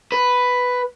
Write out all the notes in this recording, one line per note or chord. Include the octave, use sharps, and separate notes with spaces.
B4